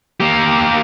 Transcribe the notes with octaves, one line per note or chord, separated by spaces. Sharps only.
A#3 G4